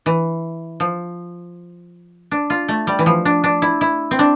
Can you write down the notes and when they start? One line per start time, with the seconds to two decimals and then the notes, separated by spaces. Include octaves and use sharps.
0.06 E3
0.80 F3
2.31 D4
2.50 F4
2.69 A3
2.87 G3
2.99 E3
3.06 F3
3.25 D4
3.44 D4
3.62 E4
3.81 E4
4.11 C4
4.19 D4